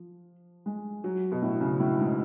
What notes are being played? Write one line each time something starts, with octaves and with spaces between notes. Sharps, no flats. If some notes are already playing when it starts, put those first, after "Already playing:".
Already playing: F3
G#3
F#3
B2
A2
C#3
A2
G#2